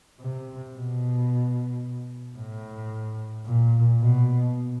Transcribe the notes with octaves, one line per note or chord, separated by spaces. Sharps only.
C3
B2
A2
A#2
B2